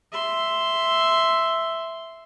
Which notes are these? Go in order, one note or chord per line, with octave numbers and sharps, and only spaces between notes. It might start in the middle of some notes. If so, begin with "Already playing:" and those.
E5 C6